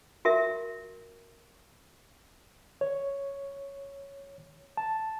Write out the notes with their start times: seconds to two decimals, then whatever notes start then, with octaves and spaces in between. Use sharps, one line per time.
0.25 F#4 A#4 E5
2.81 C#5
4.77 A5